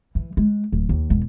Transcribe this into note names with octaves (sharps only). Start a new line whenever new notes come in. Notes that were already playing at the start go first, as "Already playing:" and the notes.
E3
G#3
D1
D#2
E1